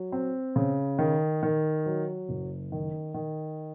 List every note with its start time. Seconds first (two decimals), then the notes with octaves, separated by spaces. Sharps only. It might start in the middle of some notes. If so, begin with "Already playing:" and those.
Already playing: F#3
0.12 C4
0.56 C#3
0.99 D#3
1.43 D#3
1.86 F#3
2.29 F#1
2.72 D#3
3.14 D#3